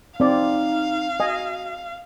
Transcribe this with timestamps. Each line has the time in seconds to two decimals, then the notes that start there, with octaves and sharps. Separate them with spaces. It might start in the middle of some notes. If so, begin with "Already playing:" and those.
0.20 C4 D#4 D5 F5
1.20 F#4 D#5 G#5